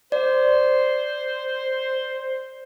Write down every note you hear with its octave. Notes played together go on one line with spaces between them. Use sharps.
C5 D5